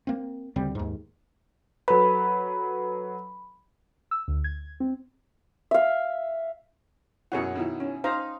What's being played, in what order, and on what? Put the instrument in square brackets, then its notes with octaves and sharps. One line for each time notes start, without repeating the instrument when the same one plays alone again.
[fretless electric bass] A#3 C4
D2 C#3 G3 C4
D#2 G#2
[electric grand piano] F#3 A4 B4 [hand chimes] B5
[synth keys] E6
D2
G#6
C4
[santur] E5 F5
[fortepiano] F#2 B2 E3 [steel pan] G#4 C#5 F#5
[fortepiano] B2 D#3 E3
[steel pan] C#4
[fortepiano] D#4 [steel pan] C5 F5 A#5